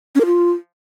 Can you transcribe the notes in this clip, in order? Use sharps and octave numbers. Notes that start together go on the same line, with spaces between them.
C#4
A#4
F4